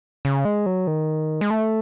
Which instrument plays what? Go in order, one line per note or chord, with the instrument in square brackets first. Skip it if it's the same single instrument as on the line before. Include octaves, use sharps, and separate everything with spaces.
[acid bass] C#3
G#3
F#3
D#3
G#3
A3